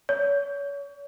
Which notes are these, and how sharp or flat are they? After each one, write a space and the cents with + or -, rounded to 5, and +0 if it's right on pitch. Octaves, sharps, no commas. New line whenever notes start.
C#5 +35